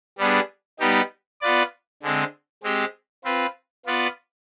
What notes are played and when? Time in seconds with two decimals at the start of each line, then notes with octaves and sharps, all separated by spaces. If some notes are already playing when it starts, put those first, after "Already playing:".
0.18 G3 B3 D4 G#4
0.80 G3 B3 D#4 G4
1.41 B3 F4 B4 D5
2.02 D3 G#3 C4
2.63 G#3 C4 G4
3.24 C4 F4 B4
3.86 B3 F4 B4 D5